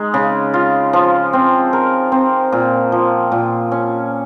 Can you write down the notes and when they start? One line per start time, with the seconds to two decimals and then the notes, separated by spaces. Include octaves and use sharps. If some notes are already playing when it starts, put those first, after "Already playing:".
Already playing: G#3 D#4
0.14 C#3
0.54 F4
0.93 F3
1.33 C4
1.73 A#4
2.12 C4
2.52 A#2
2.92 F3
3.32 A#2
3.72 C#4